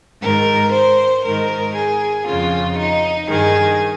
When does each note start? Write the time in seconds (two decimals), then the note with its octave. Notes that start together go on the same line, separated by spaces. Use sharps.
0.21 G#2 D#3 A#4
0.72 C5
1.23 G#2 D#3 A#4
1.74 G#4
2.26 F2 C#3 F4
2.78 D#4
3.29 G2 D#3 G#4